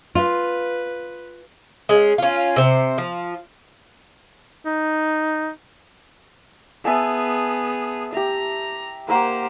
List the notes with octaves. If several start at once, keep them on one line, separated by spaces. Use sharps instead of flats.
F4 B4
G#3 C#4
C#4 F4
C3 C5
F3
D#4
B3 G#4 E5 G#5 A5
G4 E5 A#5
A#3 G4 A#4 C5 F#5